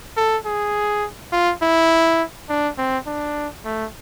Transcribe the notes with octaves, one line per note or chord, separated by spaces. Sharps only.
A4
G#4
F4
E4
D4
C4
D4
A3